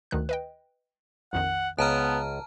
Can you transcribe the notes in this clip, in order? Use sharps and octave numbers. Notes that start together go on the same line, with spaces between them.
D2 D#3 F#6
B4 D#5 G5
A#1 F2 D#3 F#5
C#2 B3 A5 A#5 F6